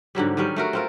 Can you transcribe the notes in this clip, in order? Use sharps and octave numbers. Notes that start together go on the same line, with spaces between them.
G#2 D3 F#3 G3
D#3 F#3 G3 C#4
A3 F#4 A#4
C4 F4 A#4